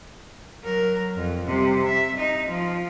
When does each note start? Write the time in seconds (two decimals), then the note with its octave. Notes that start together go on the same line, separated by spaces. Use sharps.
0.63 F#3 A#4
1.16 F2
1.46 C3 G3
1.85 E5
2.17 D#4
2.49 F3